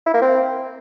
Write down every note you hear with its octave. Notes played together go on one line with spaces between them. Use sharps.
E4
A#3
C4